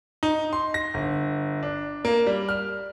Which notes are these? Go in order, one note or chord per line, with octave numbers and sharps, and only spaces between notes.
D#4
C6
A#6
G1
D4
A#3
G3
F6